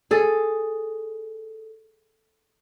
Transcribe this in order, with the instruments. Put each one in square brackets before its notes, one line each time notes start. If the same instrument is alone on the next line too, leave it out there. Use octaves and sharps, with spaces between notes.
[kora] G#4 A4